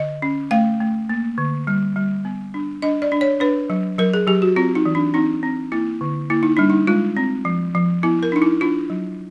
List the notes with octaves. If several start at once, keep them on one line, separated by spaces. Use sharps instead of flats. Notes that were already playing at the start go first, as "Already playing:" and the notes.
Already playing: D3 D#5
C#4
A3 F5
A3
A#3
D3
G3
G3
B3
D4
D4 D#5
D5
D4
C#5
D4 B4
F#3
F#3 A#4
G#4
F#3 G4
F#4
C4 F4
D#4
E3
D4
C4 D#4
C4
A#3 E4
D3
A#3 E4
D#4
G3 D4
D#4
G#3 F4
C4
F3
F3
B3 E4
A#4
D4 D#4
E4
D4 F4
F#3